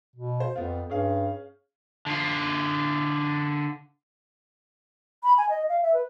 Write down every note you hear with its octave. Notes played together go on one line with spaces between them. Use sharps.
B2
C5
F2 B3 F4
G2 C#4 G#4 F5
D3 F4
B5
G#5
D#5
F5
E5
B4